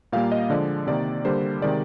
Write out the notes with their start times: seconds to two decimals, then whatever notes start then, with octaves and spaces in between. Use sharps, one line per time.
0.13 A#2 G3 A#3 F5
0.32 D#5
0.50 D3 F3 G#3 D5
0.87 C3 D#3 A#3 D5
1.25 D3 G3 A#3 C5
1.62 C3 D#3 G#3 D5